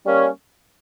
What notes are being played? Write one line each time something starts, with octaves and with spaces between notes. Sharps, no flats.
G3 A#3 C#4